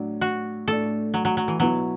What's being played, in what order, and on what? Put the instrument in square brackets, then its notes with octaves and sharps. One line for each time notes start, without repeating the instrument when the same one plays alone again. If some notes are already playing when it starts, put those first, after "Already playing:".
Already playing: [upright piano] A2 F#3 D4
[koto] F#4
[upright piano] A2 A3 D4 [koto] A4
[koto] F#3
F#3
F#3
E3
[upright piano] B2 B3 E4 [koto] F#3